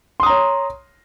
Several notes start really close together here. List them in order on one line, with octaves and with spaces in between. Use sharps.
C6 D#6 A#5 C#5